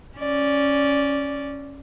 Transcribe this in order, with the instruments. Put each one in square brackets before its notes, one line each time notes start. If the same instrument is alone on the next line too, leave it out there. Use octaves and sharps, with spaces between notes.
[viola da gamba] C#4 D5